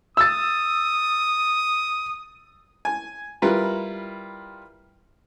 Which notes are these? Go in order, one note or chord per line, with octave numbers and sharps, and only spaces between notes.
D#6 E6 A6
G#5
G3 E4 F4 A#4 B4